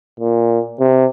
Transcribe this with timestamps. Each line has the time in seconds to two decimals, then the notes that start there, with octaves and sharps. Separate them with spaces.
0.20 A#2
0.80 C3